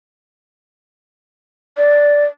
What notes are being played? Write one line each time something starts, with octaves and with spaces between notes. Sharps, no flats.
D5